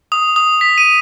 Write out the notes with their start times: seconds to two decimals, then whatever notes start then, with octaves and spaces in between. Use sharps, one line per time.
0.12 D#6
0.36 D#6
0.61 B6
0.78 D#7